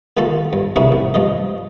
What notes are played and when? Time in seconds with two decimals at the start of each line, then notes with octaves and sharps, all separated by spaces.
0.17 D#3 G#3 F4 F#4 A4 A5
0.53 G2
0.76 C3 D4 E4 F#4 G#4 A#4
0.92 A1
1.14 G2 F3 G#3 D#5